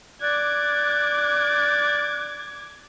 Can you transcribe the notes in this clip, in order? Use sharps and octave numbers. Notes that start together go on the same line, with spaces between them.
D5 D6 F#6 G#6